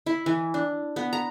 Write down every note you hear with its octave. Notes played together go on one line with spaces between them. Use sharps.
E4
E3
D4
B3
A#5